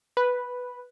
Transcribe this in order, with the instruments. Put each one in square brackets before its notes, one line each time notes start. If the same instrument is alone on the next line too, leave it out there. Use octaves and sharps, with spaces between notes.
[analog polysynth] B4